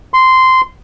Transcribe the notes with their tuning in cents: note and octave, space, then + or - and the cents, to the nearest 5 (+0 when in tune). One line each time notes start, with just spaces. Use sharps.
C6 -10